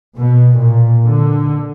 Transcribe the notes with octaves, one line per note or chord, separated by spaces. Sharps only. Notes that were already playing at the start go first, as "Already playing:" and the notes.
B2
A#2
D3